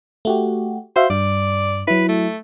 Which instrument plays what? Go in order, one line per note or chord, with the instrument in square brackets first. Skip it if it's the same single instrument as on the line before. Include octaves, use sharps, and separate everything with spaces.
[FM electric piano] A3 F#4 G4
[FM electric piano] F#4 E5 F5 [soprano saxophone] C5
[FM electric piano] G2 [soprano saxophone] D5
[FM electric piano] F#3 E4 [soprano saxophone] B4
[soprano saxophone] A3